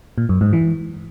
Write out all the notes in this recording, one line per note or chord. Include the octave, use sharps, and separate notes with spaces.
A#2
F#2
G#2
E3